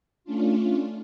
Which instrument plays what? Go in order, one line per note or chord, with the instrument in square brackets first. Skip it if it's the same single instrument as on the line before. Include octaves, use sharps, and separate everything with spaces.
[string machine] A3 C#4 D4 F4